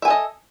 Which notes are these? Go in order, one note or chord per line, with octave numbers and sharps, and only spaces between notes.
A4 D#5 E5 G#5